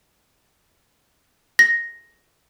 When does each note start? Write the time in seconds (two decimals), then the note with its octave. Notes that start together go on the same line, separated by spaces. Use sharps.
1.59 A#6